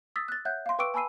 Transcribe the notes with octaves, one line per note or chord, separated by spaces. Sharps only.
D#6 E6 A6 B6
F#6 A6
C#5 E5 F#5 F#6 G6
F5 C6
B4 G5 C#6 D6 E6 D7
G#5 A5 B5 E6 C7 D#7